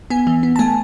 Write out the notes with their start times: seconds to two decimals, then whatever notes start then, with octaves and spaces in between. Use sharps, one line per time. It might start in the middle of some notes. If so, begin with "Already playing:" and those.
0.10 B3 G#5
0.27 E3
0.43 B3
0.56 A5
0.59 A3 G#5